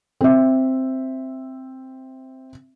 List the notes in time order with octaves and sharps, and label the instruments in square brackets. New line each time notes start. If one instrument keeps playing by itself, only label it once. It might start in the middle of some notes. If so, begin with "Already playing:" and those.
[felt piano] C4 E5